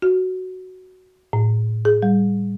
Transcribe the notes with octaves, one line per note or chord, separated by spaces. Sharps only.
F#4
A2
G#4
G3